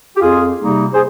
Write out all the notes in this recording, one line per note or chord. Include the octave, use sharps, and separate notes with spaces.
G4
F2 F4 G#4
C3 G3 A#3 D#4
G#4 C5